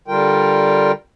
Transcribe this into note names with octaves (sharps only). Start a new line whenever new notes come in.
D3 G3 F4 A#4 G5